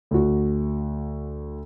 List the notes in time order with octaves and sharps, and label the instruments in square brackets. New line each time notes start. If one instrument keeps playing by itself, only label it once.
[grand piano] D2 F#4